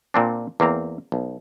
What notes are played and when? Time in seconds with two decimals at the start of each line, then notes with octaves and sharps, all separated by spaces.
0.14 A#2 C4 D4
0.60 E2 A#3 C4 A#5
1.12 B1